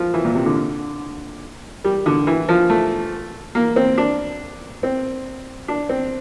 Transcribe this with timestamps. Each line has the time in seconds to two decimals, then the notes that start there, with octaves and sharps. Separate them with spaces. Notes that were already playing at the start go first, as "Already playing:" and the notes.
Already playing: F3
0.14 E3
0.24 A#2
0.35 C3
0.46 D3
1.84 G3
2.06 D3
2.27 E3
2.49 F3
2.69 A3
3.55 A#3
3.76 C4
3.98 D4
4.83 C4
5.68 D4
5.89 C4